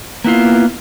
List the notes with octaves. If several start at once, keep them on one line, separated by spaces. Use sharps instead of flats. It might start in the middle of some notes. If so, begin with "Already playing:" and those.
A#3 B3 E4 F4